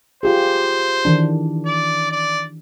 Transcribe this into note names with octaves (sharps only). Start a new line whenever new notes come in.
F4 G4 G#4 C5
D#3 E3 D4
D5
D5